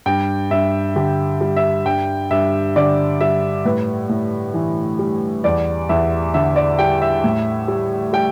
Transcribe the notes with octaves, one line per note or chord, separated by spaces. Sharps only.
G2 G5
G2 E5
D3 G4
G3
E5
G2 G5
G2 E5
D3 D5
G3 E5
A2 B4
A2
E3
G3
E2 D5
E2 E5
D3 E5
D5
G3 G5
E5
A2
G3
G3 G5